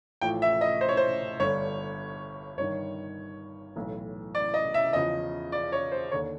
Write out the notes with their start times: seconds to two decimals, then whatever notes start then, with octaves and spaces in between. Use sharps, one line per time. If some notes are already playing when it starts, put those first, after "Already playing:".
0.21 A1 A2 F3 G5
0.42 E5
0.61 D#5
0.81 C5
0.89 C#5
0.97 C5
1.40 G1 G2 D3 C#5
2.57 G1 G2 D#3 C#5
3.76 B1 A2 E3
4.35 D5
4.54 D#5
4.74 E5
4.93 E2 C#3 F3 D#5
5.52 D5
5.72 C#5
5.92 C5
6.11 D#2 D3 C#5